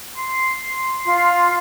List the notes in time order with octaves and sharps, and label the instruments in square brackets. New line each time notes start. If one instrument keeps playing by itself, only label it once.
[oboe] C6
[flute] F4 [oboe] C6